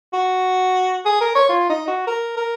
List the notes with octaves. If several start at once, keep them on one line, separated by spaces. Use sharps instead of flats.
F#4
G#4
A#4
C#5
F4
D#4
F#4
A#4
A#4